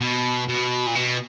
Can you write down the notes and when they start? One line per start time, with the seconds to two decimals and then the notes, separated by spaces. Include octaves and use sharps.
0.01 B2
0.48 B2
0.87 A#2
0.95 B2